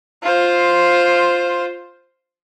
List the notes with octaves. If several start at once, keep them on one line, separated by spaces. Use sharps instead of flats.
F4 C5